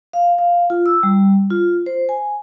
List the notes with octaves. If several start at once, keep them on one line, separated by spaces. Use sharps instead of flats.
F5
F5
F4
E6
G3
F4
C5
G#5